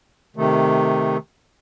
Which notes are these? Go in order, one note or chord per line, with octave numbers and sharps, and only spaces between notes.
C3 D#3 A3